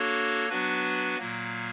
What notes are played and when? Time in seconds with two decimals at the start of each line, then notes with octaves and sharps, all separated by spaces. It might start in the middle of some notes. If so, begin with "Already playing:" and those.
Already playing: A#3 D4 F#4 A4 C#5
0.49 F#3 B3 D4 F#4 B4
1.18 A#2 F#3 A#3